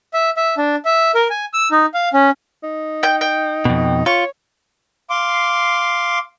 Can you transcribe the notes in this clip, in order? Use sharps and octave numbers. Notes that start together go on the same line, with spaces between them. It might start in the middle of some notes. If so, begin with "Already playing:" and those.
E5
E5
D4
E5
A#4
G#5
E6
D#4
F5
C#4
D#4
G5 G6
G5
F2 B2
F4 C#5 C#6
F5 C6 D6